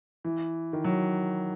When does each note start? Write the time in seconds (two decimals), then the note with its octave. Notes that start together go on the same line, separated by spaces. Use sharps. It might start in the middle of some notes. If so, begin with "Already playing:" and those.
0.25 E3
0.73 D#3
0.84 F#3